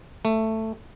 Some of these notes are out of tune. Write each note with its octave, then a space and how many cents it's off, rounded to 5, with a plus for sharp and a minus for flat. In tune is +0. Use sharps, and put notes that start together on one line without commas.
A3 +10